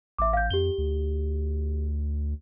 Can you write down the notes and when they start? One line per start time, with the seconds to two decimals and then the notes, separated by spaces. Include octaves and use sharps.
0.19 A1 E5 D6
0.33 F5 G6
0.51 F2 G4 G7
0.78 D2